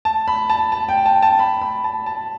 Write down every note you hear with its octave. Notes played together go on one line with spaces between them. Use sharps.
A5
B5
A5
A5
G5
A5
A5
B5
B5
A5
A5